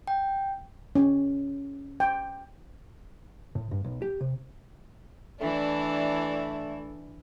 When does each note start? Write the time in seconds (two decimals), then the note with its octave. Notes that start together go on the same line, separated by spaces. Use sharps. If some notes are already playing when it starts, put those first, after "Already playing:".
0.07 G5
0.95 C#4
2.00 G5
3.55 A2
3.71 G2
3.84 B1
4.02 G4
4.21 C3
5.41 E3 A3 D4 E4 D5